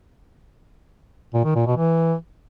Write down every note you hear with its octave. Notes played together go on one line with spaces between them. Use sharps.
A#2
D#3
A#2
B2
E3